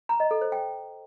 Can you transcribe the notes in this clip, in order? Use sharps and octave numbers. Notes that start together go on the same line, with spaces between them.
A#5
D#5
A4
C5
G5